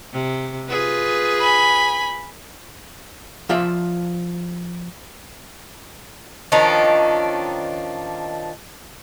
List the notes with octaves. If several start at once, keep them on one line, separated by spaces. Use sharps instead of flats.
C3
F4 G#4 B4
G#5 B5
F3 F4 D5 E5
D#3 F3 C#4 D4